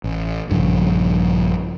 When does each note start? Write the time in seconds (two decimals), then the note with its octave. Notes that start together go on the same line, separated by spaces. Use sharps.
0.04 A1
0.49 A#1 G2 C#3 F3